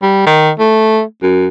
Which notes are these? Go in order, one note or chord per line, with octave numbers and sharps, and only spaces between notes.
G3
D#3
A3
F#2